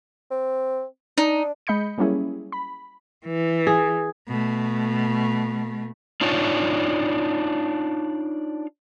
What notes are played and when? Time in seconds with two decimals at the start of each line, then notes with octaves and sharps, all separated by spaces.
0.31 C4
1.18 D4 D#4
1.67 G#3 D#5 B5 G6 C#7
1.98 F#3 G3 A#3 C#4 E4 G#4
2.52 B5
3.26 E3
3.67 G#4
4.28 B2 A3
6.21 D4 D#4 F4 C#5